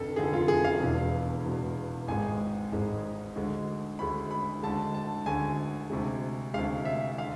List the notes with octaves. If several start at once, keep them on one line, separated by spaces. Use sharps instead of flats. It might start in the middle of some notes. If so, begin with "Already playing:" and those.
Already playing: F1 F2 D3 A4
F1 F2 D3 G#4
F4
G#4
F5
E1 E2 B2
E1 E2 B2
G#1 G#2 G#3 G#5
G#1 G#2 G#3
D2 D3 G#3
D2 D3 G#3 B5
B5
D2 D3 G#3 A5
A5
D2 D3 G#3 G#5
D2 C3 G#3
D2 C3 G#3 F5
E5
D3 F5